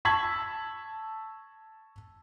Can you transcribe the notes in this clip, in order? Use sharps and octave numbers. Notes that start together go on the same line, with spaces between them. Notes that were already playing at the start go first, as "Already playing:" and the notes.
A5 C#6 E6 G#6 B6 F#7